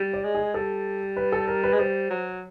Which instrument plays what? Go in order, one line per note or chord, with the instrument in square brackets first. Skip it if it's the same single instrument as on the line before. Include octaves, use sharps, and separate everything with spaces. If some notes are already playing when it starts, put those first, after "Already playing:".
Already playing: [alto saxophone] G3
[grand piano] D5
[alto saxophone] G#3
[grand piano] G#4
[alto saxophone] G3 [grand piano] A4
[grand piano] B4
A4
A#4
B4
[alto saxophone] G#3
[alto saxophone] G3 [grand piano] C5
[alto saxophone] F#3